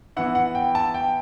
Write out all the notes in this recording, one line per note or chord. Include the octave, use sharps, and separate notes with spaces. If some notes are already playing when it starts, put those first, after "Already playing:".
E3 B3 E4 F#5
F#5
G5
A5
G5